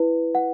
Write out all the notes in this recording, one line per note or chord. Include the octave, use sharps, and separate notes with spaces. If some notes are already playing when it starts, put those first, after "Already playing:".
Already playing: E4 B4
F#5